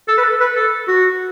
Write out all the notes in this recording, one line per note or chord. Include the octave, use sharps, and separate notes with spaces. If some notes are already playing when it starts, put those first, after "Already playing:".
A4
B4
A4
B4
A4
F#4